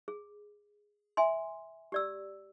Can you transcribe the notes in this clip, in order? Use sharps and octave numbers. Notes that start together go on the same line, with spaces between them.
G#4
E5 G#5 C6
G4 D5 E6